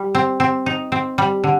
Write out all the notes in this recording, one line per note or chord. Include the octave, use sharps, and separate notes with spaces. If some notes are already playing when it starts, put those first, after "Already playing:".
Already playing: G3
C4
C4
D#4
C4
G3
D3